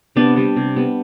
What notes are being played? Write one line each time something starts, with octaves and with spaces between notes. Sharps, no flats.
C3 B3 D4
G3 B3
C3
G3 B3